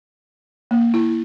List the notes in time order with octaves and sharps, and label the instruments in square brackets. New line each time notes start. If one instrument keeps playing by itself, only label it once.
[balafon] A#3
E4